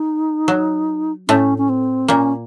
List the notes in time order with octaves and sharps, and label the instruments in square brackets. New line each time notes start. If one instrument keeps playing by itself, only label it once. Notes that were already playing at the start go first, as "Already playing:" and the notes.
Already playing: [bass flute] D#4
[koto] F#3
[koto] A2 A3 [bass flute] C#4
[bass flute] C#4
C4
[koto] A#2 A#3 [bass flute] C#4